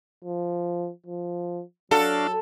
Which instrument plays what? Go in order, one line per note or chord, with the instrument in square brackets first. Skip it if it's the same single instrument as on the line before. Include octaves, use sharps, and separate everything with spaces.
[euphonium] F3
F3
[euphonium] F#3 [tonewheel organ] D4 F#4 F5 [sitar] A4